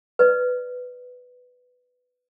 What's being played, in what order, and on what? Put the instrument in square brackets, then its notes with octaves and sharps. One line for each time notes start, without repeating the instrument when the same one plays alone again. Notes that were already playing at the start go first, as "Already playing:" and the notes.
[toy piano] B4 D5